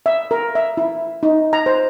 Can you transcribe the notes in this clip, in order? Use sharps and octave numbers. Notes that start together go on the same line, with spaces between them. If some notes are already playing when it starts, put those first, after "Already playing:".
E5
A#4
E5
E4
D#4
A#5
C5